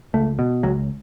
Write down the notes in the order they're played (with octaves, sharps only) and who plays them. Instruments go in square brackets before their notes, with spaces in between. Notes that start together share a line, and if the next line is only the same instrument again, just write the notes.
[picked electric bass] C#2 A3
B2
C#2 F#3